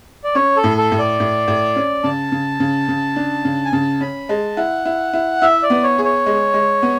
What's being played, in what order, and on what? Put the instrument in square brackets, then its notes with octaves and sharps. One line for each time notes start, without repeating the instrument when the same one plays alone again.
[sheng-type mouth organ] D5
[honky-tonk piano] C#4 [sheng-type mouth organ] C#5
[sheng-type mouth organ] A4
[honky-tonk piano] A2
[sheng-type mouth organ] A4
[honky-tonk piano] A2
[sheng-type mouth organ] D5
[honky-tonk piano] A2
A2
C#4
[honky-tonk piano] C#3 [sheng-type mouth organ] A5
[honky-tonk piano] C#3
C#3
C#3
D4
C#3
[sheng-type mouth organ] G#5
[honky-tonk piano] C#3 [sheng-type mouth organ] A5
[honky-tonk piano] C#4 [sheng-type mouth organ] B5
[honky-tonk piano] G#3 [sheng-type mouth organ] A5
[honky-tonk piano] E4 [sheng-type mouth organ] F#5
[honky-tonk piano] E4
E4
[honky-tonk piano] E4 [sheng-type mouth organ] E5
[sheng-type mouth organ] D5
[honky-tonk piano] B3
[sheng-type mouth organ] C#5
[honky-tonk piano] G#4
[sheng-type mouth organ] C#5
[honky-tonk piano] G#3
G#3
B3